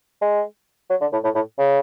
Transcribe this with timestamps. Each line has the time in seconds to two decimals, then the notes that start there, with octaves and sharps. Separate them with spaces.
0.22 G#3
0.90 F#3
1.01 D3
1.13 A2
1.24 A2
1.35 A2
1.59 C#3